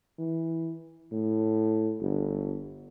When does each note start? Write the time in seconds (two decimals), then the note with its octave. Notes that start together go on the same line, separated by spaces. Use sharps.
0.19 E3
1.12 A2
2.01 G1